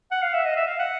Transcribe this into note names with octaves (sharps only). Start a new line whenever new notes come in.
F#5
F5
E5
D#5
E5
F5
F#5